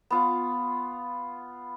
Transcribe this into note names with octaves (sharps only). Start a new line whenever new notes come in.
B3 F4